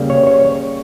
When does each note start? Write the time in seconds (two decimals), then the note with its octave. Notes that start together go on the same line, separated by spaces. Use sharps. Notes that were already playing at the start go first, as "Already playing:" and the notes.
Already playing: C#3 G3 A#3
0.10 C#5
0.27 C#5